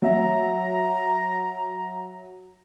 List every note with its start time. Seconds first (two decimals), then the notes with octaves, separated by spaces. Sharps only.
0.02 F#3 E5 A#5